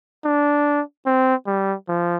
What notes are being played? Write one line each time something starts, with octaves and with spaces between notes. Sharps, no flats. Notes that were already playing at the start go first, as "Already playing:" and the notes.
D4
C4
G3
F3